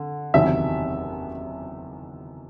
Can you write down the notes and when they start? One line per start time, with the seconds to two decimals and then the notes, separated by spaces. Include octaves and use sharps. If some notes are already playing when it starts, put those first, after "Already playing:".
Already playing: D3
0.34 F#1 E2 C3 D#3 F#3 E5